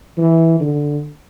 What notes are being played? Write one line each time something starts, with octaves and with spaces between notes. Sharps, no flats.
E3
D3